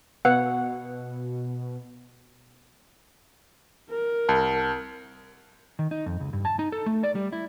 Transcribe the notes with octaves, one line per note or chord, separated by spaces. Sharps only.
B2 B3 B4 F5 F#5 E6
A#4
C2 A5
D#3
D#4
F2
C#2
G2
A5
D#4
A4
A3
D5
G3
E4